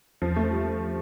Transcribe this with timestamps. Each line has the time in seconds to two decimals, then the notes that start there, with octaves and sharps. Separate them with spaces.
0.22 E2 F3
0.36 A3
0.51 G3